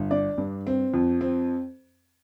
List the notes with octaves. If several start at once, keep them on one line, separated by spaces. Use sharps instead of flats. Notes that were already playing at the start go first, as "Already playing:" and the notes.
Already playing: G1
D4 D5
G2
C4
F2
C4